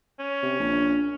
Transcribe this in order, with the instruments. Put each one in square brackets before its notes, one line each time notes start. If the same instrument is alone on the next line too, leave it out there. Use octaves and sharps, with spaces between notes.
[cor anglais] C#4
[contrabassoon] C3
A#1